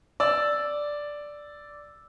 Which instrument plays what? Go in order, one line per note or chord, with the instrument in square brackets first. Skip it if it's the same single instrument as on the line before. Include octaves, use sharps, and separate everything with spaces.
[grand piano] D5 E6